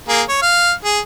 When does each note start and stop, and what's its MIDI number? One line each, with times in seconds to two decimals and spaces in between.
0.09 0.22 58
0.09 0.22 68
0.29 0.40 73
0.42 0.71 77
0.85 0.99 68